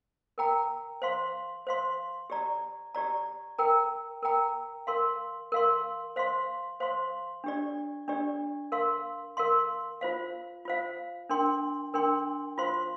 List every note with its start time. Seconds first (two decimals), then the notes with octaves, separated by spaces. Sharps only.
0.38 A#4 G5 A#5
1.02 C5 F5 C6
1.67 C5 F5 C6
2.30 G4 D5 A#5
2.95 G4 D5 A#5
3.58 A#4 G5 A#5
4.23 A#4 G5 A#5
4.87 A#4 F5 C6
5.52 A#4 F5 C6
6.16 C5 F5 C6
6.80 C5 F5 C6
7.44 D4 G4 D5
8.08 D4 G4 D5
8.72 A#4 F5 C6
9.37 A#4 F5 C6
10.01 F4 C5 F5
10.65 F4 C5 F5
11.29 D4 A#4 G5 C6
11.94 D4 A#4 G5 C6
12.58 F4 C5 F5 C6